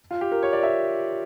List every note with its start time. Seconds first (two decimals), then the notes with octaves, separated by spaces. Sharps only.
0.11 F4
0.21 G4
0.32 A#4
0.43 C#5
0.53 D5
0.63 E5